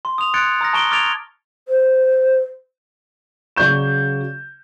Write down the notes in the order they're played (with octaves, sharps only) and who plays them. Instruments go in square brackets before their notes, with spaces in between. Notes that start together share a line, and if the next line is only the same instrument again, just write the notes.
[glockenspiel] C6
D#6 F7
C6 F#6 G#6 A6 C#7 D7
A#5 D#6 F6 A#6
A5 A#5 C#6 D7 G7
D6 F6 G#6 A6 D7 F7
[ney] C5
[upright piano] C#3 F#3 D5 C#6 G6 E7